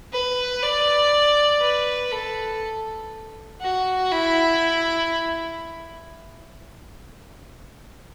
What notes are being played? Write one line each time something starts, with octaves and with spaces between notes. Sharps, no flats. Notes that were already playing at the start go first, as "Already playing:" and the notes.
B4
D5
B4
A4
F#4
E4